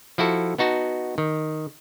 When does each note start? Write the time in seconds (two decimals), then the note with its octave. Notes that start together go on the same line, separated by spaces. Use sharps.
0.18 F3 E4 F#4 A4
0.58 B3 D#4 F#4 A5
1.18 D#3